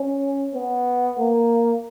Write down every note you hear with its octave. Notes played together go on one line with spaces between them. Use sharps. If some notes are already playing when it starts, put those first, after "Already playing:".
Already playing: C#4
B3
A#3